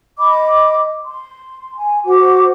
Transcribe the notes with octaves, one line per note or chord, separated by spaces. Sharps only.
D#5 B5 D6
C6
G#5
F#4 C5 F#5 D6